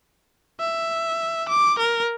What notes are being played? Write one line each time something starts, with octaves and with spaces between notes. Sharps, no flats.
E5
D6
A#4